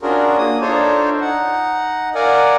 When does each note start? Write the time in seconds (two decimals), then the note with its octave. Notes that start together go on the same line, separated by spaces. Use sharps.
0.02 C#4 D4 F4 F#4 G#4 A#4
0.38 A#3 D#6
0.61 D4 D#4 F4 A4 C5 C#5
1.21 D#4 F#5
2.15 A#4 D5 F5 F#5 G#5